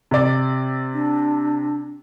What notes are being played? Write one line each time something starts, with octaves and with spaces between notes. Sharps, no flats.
C3 D5
D4